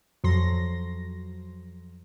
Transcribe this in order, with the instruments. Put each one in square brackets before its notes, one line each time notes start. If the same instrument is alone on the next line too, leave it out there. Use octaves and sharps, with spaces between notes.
[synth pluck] F2 F#3 C6 A#6